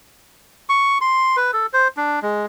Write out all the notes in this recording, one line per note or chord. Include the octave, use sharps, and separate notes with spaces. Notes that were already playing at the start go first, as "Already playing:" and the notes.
C#6
C6
B4
A4
C5
D4
G#3